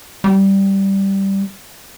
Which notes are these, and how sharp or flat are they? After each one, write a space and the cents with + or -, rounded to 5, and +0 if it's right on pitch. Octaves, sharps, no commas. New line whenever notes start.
G3 -5